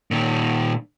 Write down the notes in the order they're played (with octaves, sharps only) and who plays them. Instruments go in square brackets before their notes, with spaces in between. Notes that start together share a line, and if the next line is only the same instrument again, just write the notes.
[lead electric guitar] A#2 D#3